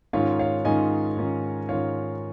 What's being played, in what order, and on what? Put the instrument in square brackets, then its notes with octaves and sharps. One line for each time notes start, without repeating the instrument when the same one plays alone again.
[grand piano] G#2 D#3 C#4 F4 C#5 F5
C#5 F5
G#2 D#3 C#4 F4 D#5 G#5
G#2 D#3 C#4 F4
G#2 D#3 C#4 F4 C#5 F5